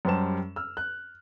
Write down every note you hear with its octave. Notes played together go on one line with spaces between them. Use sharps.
F#2 G3 G4 C5 A5 E7
E6 F6
F#6